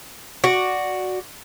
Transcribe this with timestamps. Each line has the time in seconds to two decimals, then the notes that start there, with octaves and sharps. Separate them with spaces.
0.44 F#4 D5